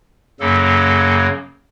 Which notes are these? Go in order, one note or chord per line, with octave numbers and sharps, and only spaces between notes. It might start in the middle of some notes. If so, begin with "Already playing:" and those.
F#2 C#3 F#3 A#3 A4